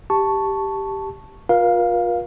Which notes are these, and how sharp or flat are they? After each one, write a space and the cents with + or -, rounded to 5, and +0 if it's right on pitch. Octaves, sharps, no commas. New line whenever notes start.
G4 +0 A5 +0 C#6 +0
F4 +35 A#4 +40 F5 +0